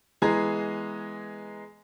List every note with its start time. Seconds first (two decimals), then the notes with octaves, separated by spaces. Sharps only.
0.22 E3 G#3 B3 G#4 A#5 G#6